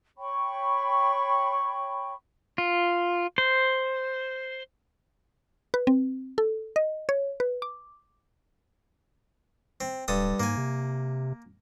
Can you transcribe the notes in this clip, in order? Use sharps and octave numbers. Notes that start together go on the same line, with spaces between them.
C#5 G5 B5 C#6
F4
C5
B4
C4
A4
D#5
C#5
B4
D6
C4
D1 G2 A4 D#6
G#2 A#3 G#5
C3